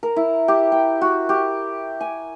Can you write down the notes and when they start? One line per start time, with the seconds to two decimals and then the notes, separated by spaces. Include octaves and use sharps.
0.03 A#4
0.16 E4
0.48 G4
0.72 G5
1.01 F#4
1.29 G4
2.01 G#5